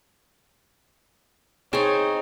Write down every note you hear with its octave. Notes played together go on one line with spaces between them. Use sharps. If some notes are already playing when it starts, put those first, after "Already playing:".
C4 D#4 G#4 C#5 G#5 A5